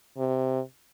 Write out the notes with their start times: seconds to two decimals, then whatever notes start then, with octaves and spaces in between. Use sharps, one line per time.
0.18 C3